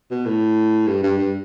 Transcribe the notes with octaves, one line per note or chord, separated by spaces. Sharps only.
B2
A2
G2
G2
G2